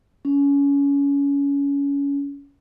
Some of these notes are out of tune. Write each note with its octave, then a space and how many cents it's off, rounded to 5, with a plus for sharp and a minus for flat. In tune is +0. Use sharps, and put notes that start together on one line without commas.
C#4 +25